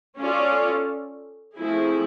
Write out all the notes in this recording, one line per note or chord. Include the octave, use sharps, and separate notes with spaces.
C#4 F4 A4 D5
F3 A3 C4 E4 G#4